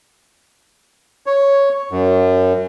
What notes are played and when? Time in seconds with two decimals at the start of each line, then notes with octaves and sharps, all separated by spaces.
1.26 C#5
1.91 F#2